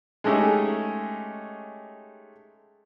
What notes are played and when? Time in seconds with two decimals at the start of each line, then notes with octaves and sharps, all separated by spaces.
0.24 G#3 A3 C#4 D#4 G4 G#4